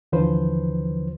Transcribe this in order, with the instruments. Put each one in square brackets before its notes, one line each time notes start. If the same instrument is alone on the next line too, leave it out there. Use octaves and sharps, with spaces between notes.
[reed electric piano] D#2 D3 E3 F3 B4 C5